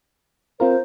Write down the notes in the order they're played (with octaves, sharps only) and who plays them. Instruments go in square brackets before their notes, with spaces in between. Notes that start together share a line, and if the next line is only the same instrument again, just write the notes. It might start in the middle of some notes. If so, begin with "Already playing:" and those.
[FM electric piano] C4 F4 A#4 [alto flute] C5